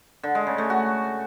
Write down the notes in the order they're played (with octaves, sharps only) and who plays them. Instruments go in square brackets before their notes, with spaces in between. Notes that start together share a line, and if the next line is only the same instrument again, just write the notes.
[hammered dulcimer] D3
G#3
C#3
A3
F#4